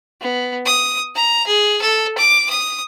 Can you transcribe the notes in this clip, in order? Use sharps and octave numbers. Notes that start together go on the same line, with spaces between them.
B3
D#6
A#5
G#4
A4
D6
D#6